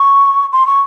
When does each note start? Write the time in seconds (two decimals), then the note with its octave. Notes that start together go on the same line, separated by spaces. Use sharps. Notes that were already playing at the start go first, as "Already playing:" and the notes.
Already playing: C#6
0.52 C6
0.67 C#6